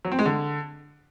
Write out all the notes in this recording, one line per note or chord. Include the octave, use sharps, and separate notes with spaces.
F#3
C4
G#3
D3